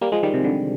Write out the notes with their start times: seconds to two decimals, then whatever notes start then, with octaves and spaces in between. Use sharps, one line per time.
0.01 G3 A#3
0.12 F3 G#3
0.23 D#3 G3
0.34 C3
0.44 D3